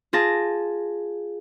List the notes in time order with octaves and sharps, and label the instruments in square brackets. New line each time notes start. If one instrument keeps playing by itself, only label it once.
[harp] F4 G#4 A5 A#6